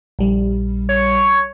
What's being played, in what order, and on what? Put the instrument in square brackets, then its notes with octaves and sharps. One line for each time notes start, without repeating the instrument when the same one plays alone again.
[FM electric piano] A#1 G3
[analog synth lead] C#5